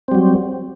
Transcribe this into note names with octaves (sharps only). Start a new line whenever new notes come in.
F#3 G3 C4